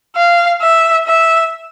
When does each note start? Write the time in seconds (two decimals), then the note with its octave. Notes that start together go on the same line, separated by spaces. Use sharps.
0.16 F5
0.62 E5
1.07 E5